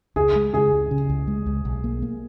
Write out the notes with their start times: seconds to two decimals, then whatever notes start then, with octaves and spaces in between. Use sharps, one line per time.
0.16 C#2 G#4
0.35 G#3
0.54 C#3 G#4
0.72 C#2
0.91 C#3
1.10 C#2
1.27 G#3
1.46 C#2
1.65 B1
1.84 A#3
2.02 A#3